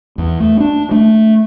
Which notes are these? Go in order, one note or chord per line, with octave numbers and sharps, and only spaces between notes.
E2
A3
D4
A3